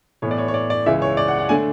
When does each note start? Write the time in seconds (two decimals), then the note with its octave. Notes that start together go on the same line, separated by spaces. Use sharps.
0.22 A2 E3 B3 C#5
0.31 D5
0.38 C#5
0.48 C#5
0.54 D5
0.70 D5
0.86 C#2 C#3 E3 G#3 E5
1.02 C#5
1.17 D5
1.28 F#5
1.39 F#5
1.49 D3 A3 D4 G#5